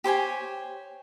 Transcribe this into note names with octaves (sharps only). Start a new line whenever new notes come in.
G4 C5 C#5 G#5